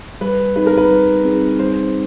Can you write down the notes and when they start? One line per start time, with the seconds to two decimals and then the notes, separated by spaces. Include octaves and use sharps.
0.21 G3 B4
0.56 C4 D#4 G#4 B4
0.67 A#4
0.77 B4
0.91 G3
1.25 C4 D#4 G#4
1.59 G3 C5